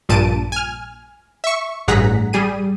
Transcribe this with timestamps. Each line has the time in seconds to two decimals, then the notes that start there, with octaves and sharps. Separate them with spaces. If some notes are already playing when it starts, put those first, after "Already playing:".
0.09 A#1 G2 A#2 A5 D7 D#7
0.52 G#5 F6
1.44 E5 C#6
1.88 A1 G2 G#4 F#5 A#5 B6
2.33 G3 G#4 D#7